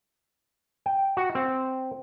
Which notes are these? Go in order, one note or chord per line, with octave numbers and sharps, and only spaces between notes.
G5
F#4
C4